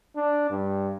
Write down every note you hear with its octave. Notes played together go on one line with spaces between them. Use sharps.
D4
G2